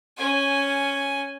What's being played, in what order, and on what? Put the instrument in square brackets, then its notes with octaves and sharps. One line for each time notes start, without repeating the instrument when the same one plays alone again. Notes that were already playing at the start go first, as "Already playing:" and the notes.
[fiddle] C#4 G#5